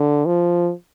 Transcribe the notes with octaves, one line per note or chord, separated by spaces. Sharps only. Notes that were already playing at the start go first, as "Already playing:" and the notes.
Already playing: D3
F3